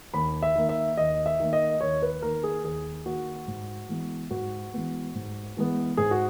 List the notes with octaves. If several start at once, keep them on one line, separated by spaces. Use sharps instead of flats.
D#2 B5
E5
D#3 A#3
E5
D#2 D#5
E5
D#3 A#3
D#5
D#2 C#5
B4
D#3 A#3 A#4
G#4
D#2 G#4
D#3 A#3 F#4
G#2
E3 G#3 B3
G#2 F#4
E3 G#3 B3
G#2
E3 G#3 B3
G#2 G#4
F#4